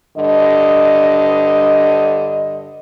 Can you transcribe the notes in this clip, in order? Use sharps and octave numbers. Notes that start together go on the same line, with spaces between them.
G2 D3 D#5